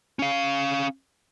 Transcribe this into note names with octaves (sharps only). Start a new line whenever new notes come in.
C#4 F5